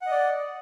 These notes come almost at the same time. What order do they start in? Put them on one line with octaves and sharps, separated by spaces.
F#5 D#5 D5